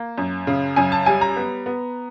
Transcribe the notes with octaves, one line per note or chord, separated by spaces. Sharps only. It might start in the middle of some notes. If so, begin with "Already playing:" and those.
Already playing: A#3
F#2
C#3
F#2 G#5
A5
G3 G#5
A#5
B3
B3